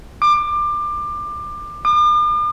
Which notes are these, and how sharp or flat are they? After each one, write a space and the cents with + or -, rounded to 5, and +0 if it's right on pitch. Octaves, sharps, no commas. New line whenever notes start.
D6 +25
D6 +45